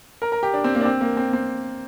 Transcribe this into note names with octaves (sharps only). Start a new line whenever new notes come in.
A#4
A#4
G4
D4
C4
A#3
D4
C4
A#3
C4
C4